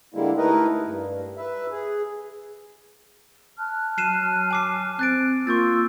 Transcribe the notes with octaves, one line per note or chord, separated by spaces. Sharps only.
D3 G3 G#3 A#3 E4
A3 D#4 E4 A#4 B4 D#5
G2
B4 E5
G#4
A5 F6 F#6
F#3 C7 D#7 E7
G#5 D6 C7
C4 F#6 A6 D7
A#3 F4 C6 C#6 E6 G6 A6